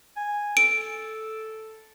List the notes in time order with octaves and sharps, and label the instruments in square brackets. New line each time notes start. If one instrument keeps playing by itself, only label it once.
[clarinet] G#5
[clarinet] A4 [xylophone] D7